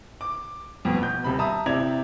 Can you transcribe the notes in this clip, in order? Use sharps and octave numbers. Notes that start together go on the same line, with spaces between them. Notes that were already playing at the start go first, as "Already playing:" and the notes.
D6
F2 B2
B2 G6
D#1 C3 B5
E5 A5 A#5 D#6
C3 E4 D5 G#6 F7